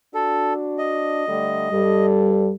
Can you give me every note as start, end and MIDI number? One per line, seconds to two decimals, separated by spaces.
0.14 1.27 62
0.14 1.27 66
0.14 0.53 69
0.79 2.06 75
1.28 1.72 50
1.28 1.72 55
1.28 1.72 57
1.73 2.50 43
1.73 2.53 55
1.73 2.50 69